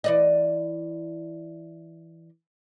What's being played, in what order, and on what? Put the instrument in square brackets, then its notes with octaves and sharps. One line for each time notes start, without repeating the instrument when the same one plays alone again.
[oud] E3 D5 D#5